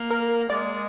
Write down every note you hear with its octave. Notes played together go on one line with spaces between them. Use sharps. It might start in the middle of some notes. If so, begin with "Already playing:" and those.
Already playing: A#3
A#4
G#3 D5